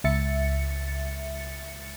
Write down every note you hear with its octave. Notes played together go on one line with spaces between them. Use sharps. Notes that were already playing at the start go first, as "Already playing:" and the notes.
C#2 E5 A6 C#7